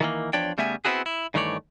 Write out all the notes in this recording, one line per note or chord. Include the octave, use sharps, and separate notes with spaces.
D#3 E3 A#3
E2 F3 D4 C#5 D5 G5
C#3 G3 A3 B3 E5 G#5
B3 C4 D4 E4 F#4 G#4
E4
G2 D#3 E3 A3 C#5 D5